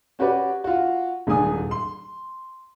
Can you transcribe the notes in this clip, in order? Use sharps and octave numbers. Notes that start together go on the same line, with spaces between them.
C#4 F#4 G4 B4 D5
F4 F#4
D#1 G#2 G#3 D4 G#5 D#6
C6